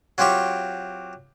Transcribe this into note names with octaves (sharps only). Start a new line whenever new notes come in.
F#3 C4 F4 G4 C#6